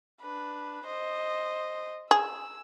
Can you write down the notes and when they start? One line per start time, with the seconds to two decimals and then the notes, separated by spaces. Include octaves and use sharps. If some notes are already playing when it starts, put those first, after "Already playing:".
0.21 D4 B4
0.85 C5 D#5
2.11 G#4 E6